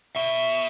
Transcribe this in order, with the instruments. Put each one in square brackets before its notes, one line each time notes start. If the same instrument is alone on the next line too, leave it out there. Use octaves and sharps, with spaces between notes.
[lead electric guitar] B2 [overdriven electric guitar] E5